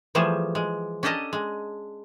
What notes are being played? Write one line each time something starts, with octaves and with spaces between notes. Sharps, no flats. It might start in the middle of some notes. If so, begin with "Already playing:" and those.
E3 F3 G3 A3 G#4
G#3
C#4 D4 G4 A4 D#5 A#5
G#3